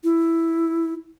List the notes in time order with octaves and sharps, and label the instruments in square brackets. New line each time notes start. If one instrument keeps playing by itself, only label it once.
[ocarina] E4